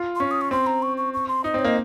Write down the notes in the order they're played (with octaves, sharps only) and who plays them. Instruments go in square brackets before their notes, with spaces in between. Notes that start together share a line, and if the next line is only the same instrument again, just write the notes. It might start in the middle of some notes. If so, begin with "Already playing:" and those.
Already playing: [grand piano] F4
[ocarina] C6
[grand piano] C#4 [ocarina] C#6
[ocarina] D#6
C#6
[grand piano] C4 [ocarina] C6
[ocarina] A#5
C#6
C#6
C#6
C6
[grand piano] D#4 [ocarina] D#5
[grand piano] C4
[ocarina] C#5
[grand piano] A#3 [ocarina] D#5